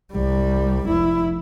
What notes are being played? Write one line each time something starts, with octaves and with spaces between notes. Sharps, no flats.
C2 G3
F1 E4